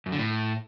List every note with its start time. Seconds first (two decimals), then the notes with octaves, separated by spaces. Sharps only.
0.06 F#2
0.12 D3
0.19 A2